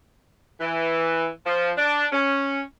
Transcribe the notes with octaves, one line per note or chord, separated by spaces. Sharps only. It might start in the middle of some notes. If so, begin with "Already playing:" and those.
E3
F3
D4
C#4